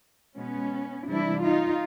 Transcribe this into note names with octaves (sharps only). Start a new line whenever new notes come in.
B2 G#3 B3 C#4
C3 E3 G3 D4 E4
D#4 F4